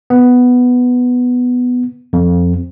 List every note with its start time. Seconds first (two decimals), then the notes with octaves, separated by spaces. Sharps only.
0.10 B3
2.13 F2